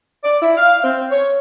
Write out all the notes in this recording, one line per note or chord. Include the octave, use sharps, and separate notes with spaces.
D5
E4
F5
C4
C#5